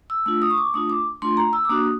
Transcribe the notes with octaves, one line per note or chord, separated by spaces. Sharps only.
E6
A3 D4 F4 E6
D#6
C#6
D6
A3 D4 F4 D#6
D6
A3 D4 F4 C6
A#5
E6
D6
A#3 D4 F#4 D#6